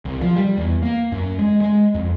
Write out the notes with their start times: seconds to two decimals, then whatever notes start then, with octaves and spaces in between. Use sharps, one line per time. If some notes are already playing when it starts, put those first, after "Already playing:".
0.05 C2
0.21 F3
0.36 G3
0.57 E2
0.82 A#3
1.12 F#2
1.39 G#3
1.61 G#3
1.95 F2